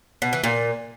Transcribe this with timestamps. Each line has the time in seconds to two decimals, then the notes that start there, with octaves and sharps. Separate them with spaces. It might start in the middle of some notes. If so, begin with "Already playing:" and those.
0.22 B2
0.33 E3
0.44 A#2